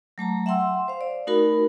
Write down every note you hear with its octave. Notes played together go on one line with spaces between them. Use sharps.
F#3 A3 A5 A#5
E5 F#5 G5 C6 E6
C5 F5
D5
A3 D#4 F#4 A#4 B5